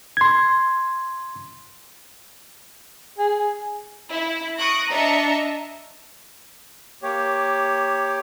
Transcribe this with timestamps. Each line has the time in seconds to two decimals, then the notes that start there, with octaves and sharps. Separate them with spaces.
0.17 C6 G#6
3.18 G#4
4.11 E4
4.57 C#6 D#6 F#6 A#6 D7
4.90 D4 D#5 E5 A#5 C#7
7.03 A#3 G4 C#5